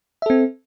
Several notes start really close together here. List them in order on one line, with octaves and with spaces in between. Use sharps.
E5 A4 C4